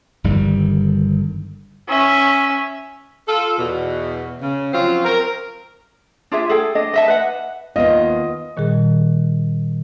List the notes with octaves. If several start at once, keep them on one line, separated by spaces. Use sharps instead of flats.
G1 G2 D#3 G3
C#4 E5
F4 A4
E2 B2
C#3
F3 F#3 C4 C#4 F4
C4 A#4
D4 F4 G#4 E5
G#4 A4 G5
D4 D#5
D#5 E5 A5
B4 F#5
D#2 B3 F4 D#5
A#2 D#3 G3 G#4